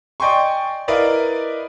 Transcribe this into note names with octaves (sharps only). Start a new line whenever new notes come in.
D5 D#5 G5 G#5 C6 C#6
E4 A#4 B4 D5 D#5 F5